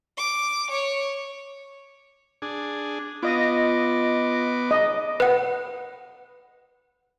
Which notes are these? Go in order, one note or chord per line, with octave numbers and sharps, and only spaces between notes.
D6
C#5
D4 G#4
B3 F4 D#5 D6 A#6
D#5
B4 F#5